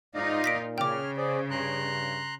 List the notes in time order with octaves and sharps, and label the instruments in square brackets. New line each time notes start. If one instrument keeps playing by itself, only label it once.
[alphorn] G#2 [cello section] D#4 F4 [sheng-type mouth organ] D5 D#5 F5
[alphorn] A#2 [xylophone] A#6 B6 D7
[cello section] C#3 [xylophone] G5 D6 [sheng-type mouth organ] F6
[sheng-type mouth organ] G#4 D5 [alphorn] C5
[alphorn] G2 [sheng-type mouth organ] A#5 C6 F#6